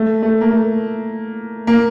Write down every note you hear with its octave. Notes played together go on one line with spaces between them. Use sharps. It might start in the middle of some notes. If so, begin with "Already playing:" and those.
Already playing: A3
A3
A#3
A3
A#3